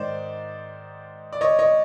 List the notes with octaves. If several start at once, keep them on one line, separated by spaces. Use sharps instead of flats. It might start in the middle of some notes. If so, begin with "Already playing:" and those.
Already playing: G#2 D#3 C5 D5
D5
C#5 D#5
C#5 D#5